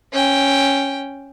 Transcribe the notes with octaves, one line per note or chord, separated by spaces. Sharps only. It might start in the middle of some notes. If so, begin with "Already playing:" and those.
C#4 G5